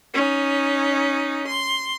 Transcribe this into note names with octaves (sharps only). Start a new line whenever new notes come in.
C#4 D#4
C6